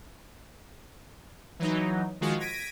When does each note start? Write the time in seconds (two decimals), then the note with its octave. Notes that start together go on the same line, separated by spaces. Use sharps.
1.59 E3 F#3 D#4
2.21 D#3 F3 G#3 F4 F#4
2.40 G#6 A#6 B6 D7 D#7